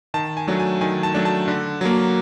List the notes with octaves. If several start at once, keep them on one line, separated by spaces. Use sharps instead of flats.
D#3 A5
G#5
F#3 A3 D4
G#5
D#3 G#5
A5
F#3 A3 D4
A5
D3
F#3 A#3